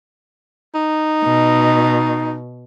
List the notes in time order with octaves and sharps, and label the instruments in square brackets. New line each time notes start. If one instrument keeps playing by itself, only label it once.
[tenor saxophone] D#4
[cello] B2